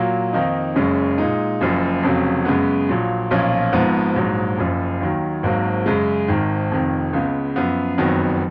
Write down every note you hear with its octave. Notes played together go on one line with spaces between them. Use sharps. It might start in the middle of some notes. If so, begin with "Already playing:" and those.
Already playing: A#2 F#3 A#3
F2 D#3 A#3 D#4
F#1 F#2 C#3 G#3 C#4
A#2 G#3 D#4
F#1 F#2 F3
F1 F2 C#3 F#3
F#2 C#3 G#3 B3
A#1 A#2 F#3
B1 A#2 F3 A#3 C#4
G#1 G#2 F3 B3
A#1 G#2 F#3
F#1 F#2 F3
D#2 D#3 F#3
G#1 G#2 F#3 A#3
F#2 C#3 G#3
G#1 G#2 D#3
F1 F2 D#3
C#2 C#3 G#3 B3
F#2 F3 B3
F#1 F2 D#3 F#3 B3